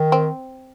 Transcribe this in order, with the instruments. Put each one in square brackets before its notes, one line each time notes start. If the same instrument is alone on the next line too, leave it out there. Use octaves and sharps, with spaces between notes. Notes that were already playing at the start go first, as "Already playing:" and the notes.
Already playing: [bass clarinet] D#3
[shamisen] C4